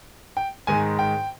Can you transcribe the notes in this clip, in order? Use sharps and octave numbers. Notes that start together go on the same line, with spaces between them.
G5
G#2 D#3 G#3 G#5
G5